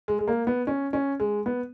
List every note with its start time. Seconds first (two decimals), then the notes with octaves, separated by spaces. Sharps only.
0.08 G#3
0.19 G#3
0.28 A#3
0.47 B3
0.67 C#4
0.93 C#4
1.20 G#3
1.46 B3